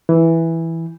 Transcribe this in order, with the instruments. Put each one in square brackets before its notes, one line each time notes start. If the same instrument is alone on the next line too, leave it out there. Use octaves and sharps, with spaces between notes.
[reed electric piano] E3